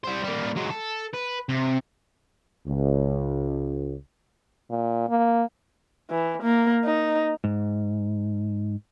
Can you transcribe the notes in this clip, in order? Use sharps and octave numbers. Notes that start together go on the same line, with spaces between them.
G3 C5
G3 A#3
F#3 G#3
A4
B4
C3
C#2
A#2
A#3
E3
A#3
D#4
G#2